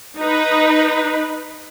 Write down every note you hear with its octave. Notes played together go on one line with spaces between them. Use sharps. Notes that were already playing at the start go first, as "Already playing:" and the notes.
D#4 B4